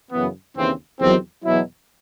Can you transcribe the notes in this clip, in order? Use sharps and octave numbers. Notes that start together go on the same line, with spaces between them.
F#2 C#3 E3 B3
D#2 C#3 E3 C4
E2 C3 D#3 F#3 C4
E2 B2 F#3 E4